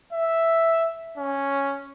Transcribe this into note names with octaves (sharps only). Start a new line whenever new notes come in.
E5
C#4